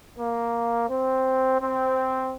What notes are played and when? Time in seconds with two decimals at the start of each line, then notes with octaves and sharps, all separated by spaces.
0.18 A#3
0.89 C4
1.61 C4